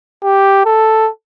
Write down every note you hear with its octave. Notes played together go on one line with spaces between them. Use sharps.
G4
A4